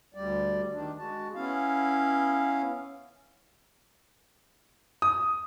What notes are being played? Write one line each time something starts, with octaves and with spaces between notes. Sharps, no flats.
D2 G3 D5
D#3 D4
G#3 F#4 A5
B3 C#4 E4 F5
D#6